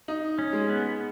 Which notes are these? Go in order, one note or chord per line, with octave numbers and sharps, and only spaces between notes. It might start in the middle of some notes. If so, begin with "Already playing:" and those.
D#4
C#4
G#3
B3